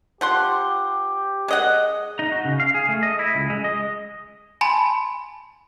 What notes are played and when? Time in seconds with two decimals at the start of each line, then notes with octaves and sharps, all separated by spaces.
0.21 F3 G4 F#5 C6
1.48 G#3 D#5 F#5
2.19 D#4
2.32 F#4
2.45 C#3
2.60 F5
2.75 G#4
2.89 A3
3.03 D#5
3.19 E4
3.35 C#2
3.50 G#3
3.64 D#5
4.61 G#5 A5 B5 C6